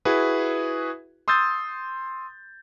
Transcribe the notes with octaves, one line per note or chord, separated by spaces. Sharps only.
E4 F#4 G#4 B4
C6 D#6 E6 G6 A6